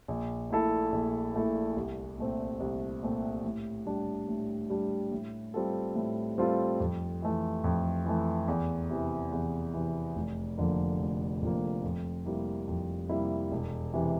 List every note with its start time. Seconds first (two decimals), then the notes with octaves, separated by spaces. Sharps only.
0.08 A#1
0.50 A#2 A3 E4 A4
0.92 A#1
1.34 A#2 A3 E4 A4
1.77 C2
2.18 A#2 A3 C4
2.60 C2
3.03 A#2 A3 C4
3.44 A2
3.86 G3 D4 G4
4.28 A2
4.70 G3 D4 G4
5.12 A2
5.54 G3 C4 F4 A4
5.96 A2
6.38 G3 C4 F4 A4
6.80 F2
7.22 E3 A3
7.64 F2
8.06 E3 A3
8.48 E2
8.90 C3 E3
9.32 E2
9.74 C3 E3
10.16 F1
10.58 F2 D3 F3 A#3
10.99 F1
11.41 F2 D3 F3 A#3
11.84 F2
12.26 C3 G3 A#3 E4
12.68 F2
13.09 C3 G3 A#3 E4
13.51 E1
13.94 C3 E3